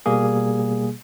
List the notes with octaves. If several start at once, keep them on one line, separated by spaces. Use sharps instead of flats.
B2 G3 A#3 G#4